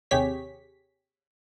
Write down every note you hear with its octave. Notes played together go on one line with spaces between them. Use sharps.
D#2 C3 G4 G#4 C#5 B6